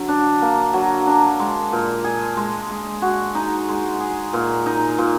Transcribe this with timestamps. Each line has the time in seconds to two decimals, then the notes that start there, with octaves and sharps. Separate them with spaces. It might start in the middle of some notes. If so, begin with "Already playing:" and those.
Already playing: D3 F#3
0.09 D4
0.42 A#3
0.73 F#3
1.07 D4
1.39 G#3
1.72 A#2
2.04 G#4
2.37 G#3
2.70 G#3
3.02 F#4
3.35 D#4
3.69 G#3
4.00 G#4
4.33 A#2
4.66 D#4
4.98 A#2